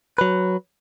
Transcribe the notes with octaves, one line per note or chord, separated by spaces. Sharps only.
F#3 B4